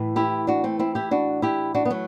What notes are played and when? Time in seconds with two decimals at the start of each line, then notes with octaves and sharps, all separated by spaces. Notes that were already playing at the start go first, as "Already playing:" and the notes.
Already playing: A2 E3
0.16 E4 G4
0.47 D4 F#4
0.64 A3 C4
0.79 C4 E4
0.95 E4 G4
1.11 D4 F#4
1.42 E4 G4
1.74 D4 F#4
1.85 B3
1.90 F#3 A3